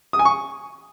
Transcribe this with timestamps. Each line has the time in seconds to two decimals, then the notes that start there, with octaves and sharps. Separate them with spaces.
0.13 D#6
0.19 G#5
0.25 C#6